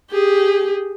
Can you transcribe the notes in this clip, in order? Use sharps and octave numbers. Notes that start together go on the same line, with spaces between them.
G4 G#4